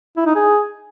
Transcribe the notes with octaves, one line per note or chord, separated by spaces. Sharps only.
E4
D#4
G#4